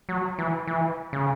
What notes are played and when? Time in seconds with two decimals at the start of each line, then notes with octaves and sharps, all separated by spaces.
0.09 F#3
0.39 E3
0.67 E3
1.13 C#3